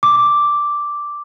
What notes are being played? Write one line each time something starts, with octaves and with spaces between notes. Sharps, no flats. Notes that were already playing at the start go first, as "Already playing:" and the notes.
D6